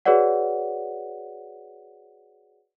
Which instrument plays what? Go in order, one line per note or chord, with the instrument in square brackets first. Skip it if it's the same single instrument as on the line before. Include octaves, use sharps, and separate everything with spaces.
[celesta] F#4 G#4 B4 C#5 D5 F#5